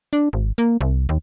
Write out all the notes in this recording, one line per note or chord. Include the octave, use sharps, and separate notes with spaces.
D4
G#1
A#3
C2
D#2